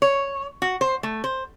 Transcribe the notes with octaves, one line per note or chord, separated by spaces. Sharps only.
C#5
F#4
C5
A3
C5